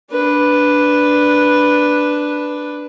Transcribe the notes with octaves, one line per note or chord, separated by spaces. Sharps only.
D4 B4